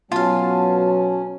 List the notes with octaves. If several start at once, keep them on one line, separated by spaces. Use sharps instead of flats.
B2 F#3 C#4 F4 F5 A5